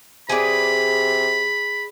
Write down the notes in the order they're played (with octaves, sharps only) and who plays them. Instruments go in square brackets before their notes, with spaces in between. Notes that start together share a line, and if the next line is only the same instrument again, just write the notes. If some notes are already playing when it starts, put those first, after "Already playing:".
[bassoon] C3 [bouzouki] G#4 B4 D5 [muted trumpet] B5